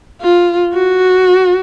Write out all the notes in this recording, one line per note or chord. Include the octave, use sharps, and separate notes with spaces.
F4
F#4